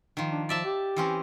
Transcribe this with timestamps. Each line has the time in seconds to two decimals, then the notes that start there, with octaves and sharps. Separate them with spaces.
0.17 D#3 F3
0.31 D4
0.49 F3 D5 E5 A5
0.64 G4
0.97 E3 C4 C#4